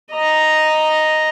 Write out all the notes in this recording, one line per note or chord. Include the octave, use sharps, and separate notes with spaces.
D#5 A#5